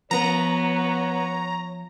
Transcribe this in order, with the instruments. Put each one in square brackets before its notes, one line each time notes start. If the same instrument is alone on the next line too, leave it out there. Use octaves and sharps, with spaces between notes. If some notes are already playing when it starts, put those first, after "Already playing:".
[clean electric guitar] F3 [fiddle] B3 [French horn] C#5 [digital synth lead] A#5